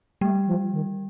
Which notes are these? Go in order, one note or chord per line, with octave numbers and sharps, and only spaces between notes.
G3 A3
F3
D#3